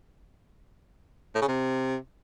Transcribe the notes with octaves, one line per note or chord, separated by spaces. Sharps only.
A2
C#3
C3